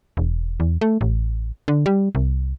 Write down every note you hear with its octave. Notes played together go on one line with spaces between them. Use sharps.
E1
E2
A3
A1
D3
G3
C2